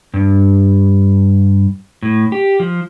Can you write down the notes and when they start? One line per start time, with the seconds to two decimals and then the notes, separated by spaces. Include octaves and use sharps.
0.14 G2
2.02 A2
2.32 G4
2.60 F3